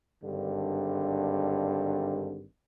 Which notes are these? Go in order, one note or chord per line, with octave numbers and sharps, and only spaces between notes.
G#1 G2 D3